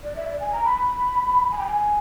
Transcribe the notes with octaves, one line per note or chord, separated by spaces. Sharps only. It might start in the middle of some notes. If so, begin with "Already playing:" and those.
D5
E5
D5
G#5
A#5
B5
G#5
G5
G#5